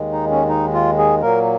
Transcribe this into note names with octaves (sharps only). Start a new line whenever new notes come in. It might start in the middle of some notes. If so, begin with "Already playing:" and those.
Already playing: D#2 D#3 G#3
D#4
C#4
D#4
F4
G#4
A#2 F#3 A#3 A#4